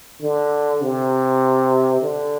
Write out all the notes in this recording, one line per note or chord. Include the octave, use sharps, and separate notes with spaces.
D3
C3
D3